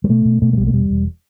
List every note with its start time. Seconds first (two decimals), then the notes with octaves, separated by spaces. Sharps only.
0.04 G3
0.09 B2 A3
0.25 B2
0.42 B2 A3
0.53 A3
0.58 B1 G3
0.67 A3
0.73 E1 G3
0.90 E1